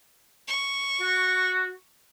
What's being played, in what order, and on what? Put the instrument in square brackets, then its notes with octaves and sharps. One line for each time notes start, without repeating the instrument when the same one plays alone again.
[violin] C#6
[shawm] F#4